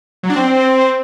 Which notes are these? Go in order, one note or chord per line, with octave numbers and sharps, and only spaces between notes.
F#3
D4
C4